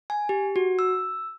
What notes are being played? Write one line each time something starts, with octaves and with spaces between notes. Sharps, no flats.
G#5
G4
F#4
E6